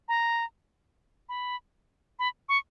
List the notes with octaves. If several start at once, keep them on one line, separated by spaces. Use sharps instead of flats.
A#5
B5
B5
C#6